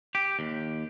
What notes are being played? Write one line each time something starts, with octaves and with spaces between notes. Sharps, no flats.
G4
D#2